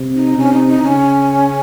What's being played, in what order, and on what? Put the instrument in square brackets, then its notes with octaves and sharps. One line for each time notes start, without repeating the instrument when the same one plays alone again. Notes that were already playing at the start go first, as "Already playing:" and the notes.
Already playing: [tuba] C3
[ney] D#4
[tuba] C3 [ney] C#4
[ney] D#4
D#4
[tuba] C#3 [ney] C#4